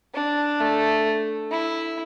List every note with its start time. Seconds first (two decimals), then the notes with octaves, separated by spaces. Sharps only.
0.14 D4
0.60 A3
1.51 E4